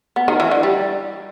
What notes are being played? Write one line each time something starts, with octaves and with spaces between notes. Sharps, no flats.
B3
D#3
E3
D3
G3